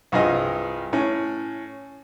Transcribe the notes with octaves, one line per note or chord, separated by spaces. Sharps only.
C2 G2 F3 G#4 D#5
A2 C#4